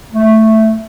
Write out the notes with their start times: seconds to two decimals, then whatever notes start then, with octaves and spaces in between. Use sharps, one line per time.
0.13 A3